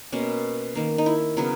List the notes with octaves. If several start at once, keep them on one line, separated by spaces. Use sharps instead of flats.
B2 A#3 C#4
D#3 A#3
D#4
E4
C#3 F#3 B3 A#4